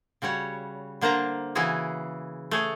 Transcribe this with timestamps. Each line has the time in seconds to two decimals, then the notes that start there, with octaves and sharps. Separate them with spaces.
0.22 C#3 G3 F#4 C#5
1.01 D3 A#3 C5 A5 A#5
1.55 C#3 E3 E4 F#4 G#4 A#5
2.51 A3 G#4 C#5